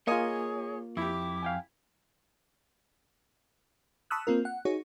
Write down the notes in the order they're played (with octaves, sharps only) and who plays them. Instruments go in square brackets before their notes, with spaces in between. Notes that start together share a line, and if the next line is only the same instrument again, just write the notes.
[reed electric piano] A#3 F4 [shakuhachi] G#4 [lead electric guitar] C#5 [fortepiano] D#5 G#5
[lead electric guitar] F2 [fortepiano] E4 G4 [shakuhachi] D6
[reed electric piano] F5 G5 G#5
[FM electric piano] A5 B5 C#6 D#6 E6 F#6
A#3 C4 F4 A#4
F#5
D#4 F#4 G#4 C#5